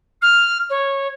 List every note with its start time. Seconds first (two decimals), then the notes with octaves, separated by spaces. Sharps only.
0.21 F6
0.69 C#5